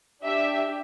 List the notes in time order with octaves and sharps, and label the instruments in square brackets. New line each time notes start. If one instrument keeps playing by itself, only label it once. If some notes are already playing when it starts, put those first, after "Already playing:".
[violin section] D4 G4 E5